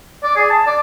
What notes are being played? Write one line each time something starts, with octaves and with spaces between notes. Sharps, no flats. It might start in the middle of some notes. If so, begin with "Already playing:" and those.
D5
G#4
A5
D5